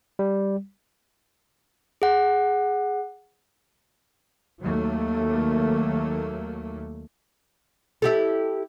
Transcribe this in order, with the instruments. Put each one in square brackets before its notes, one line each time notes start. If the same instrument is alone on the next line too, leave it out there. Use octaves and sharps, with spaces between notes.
[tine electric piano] G3
[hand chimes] G#4 F#5
[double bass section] D#2 F#3 A3 A#3
[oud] E4 G4 A4